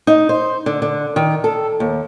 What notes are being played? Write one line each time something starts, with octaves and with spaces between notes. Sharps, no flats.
D#4
C5
D3
D3
D#3
A4
D#2